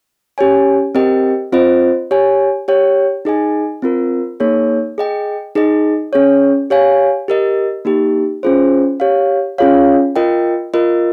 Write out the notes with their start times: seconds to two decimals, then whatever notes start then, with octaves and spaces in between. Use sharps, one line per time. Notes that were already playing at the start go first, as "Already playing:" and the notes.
0.38 C#4 G4 C#5 G#5
0.95 C4 G4 A#4 D#5 G5
1.53 C4 F4 C5 D#5
2.11 G4 C#5 G#5
2.68 G4 C#5 G5
3.25 D#4 G#4 D#5 G#5
3.82 C4 F4 A#4
4.40 A#3 D#4 G#4 C#5
4.98 G#4 D#5 G5
5.55 D#4 G#4 D#5
6.13 C#4 G#4 C#5
6.70 G4 C#5 F5 G#5
7.28 G4 A#4 D#5
7.85 A#3 D#4 G4
8.43 C#4 F4 G#4 C5
9.00 G4 C#5 F5
9.58 C#4 F4 G#4 C#5 F5
10.16 F4 A#4 D#5 G5
10.74 F4 A#4 D#5